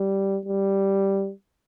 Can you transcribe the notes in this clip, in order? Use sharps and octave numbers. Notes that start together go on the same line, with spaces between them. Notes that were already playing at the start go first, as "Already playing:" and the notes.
Already playing: G3
G3